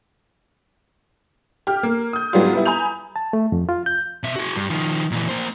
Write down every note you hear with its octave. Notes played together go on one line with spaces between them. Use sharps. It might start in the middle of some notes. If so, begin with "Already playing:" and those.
G4 F6
A#3
D#6 G6
G#2 F#3 G3 B3 D4 F4
G3 B3 E4
G#5 A#5 B5 D#6 G6 F7
A5
A3
F2
F4
G6
B2 E5
F#4 G#4
G2
D#3 F3
A#2 E3
A#3 C5